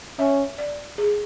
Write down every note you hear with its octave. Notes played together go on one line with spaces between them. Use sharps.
C#4 E5
D5
G#4